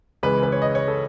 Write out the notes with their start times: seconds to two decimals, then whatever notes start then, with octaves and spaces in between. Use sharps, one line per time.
0.23 C#2 C#3 E3 G#3 B4
0.43 B4
0.52 C#5
0.62 D#5
0.75 C#5
0.88 A4